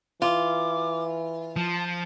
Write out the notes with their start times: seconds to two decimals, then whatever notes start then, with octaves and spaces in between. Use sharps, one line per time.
0.22 E3 F4 D6
1.56 F3 A5